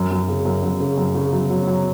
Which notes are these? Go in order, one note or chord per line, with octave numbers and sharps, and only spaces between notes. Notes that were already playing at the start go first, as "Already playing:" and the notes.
Already playing: F#2
F#2
C#3
F#2
F#2
C#3
F#2
C#3
F#3
F#3
F#3